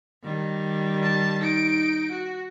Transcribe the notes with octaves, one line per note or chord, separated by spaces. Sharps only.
D#3 G3
A5
D#4 D7
F#4